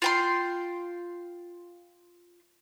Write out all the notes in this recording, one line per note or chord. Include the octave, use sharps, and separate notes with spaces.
F4 G5 C6